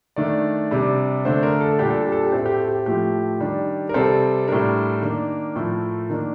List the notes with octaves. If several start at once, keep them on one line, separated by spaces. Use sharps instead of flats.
D#3 A3 D4 D5
C3 G3 D4
D3 A3 D4 C5
A#4
A4
A#2 G3 D4 G4
A4
G4
A4
G4
A2 A3 C4 A4
G4
A4
G4
A2 F3 A3 G4
D#3 G3 D4
A#4
C3 G3 C4 A4
A2 G3 D4 A#4
D#3 A#3 D4
A2 F3 A3
D#3 A#3 D4